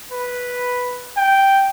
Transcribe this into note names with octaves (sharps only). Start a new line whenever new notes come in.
B4
G5